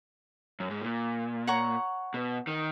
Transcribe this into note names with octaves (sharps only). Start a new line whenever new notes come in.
F#2
G#2
A#2
C#5 F#5 A#5 C#6
B2
D#3